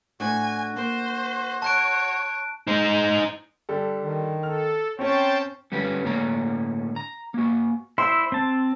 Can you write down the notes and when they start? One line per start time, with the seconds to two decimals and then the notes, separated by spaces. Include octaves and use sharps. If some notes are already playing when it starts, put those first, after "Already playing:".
0.20 A2 D4 F#4 C5 G#5
0.76 A#3 C5
1.62 C#5 A5 F#6 D7
2.67 D#4 C5
3.69 D3 G3 A4
4.03 D#3
4.43 A4 F6
4.99 C4 C#4 C5 C#5 G5 A5
5.72 D3 G3 C#4 G4 B4
6.04 A2 D3 A#3 C#5 A5 A#5
6.96 A#5
7.34 A#3 F#4
7.98 E4 C5 C6 E6
8.32 C4 A5